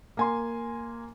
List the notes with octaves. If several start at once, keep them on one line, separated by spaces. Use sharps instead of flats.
A#3 G#5 C6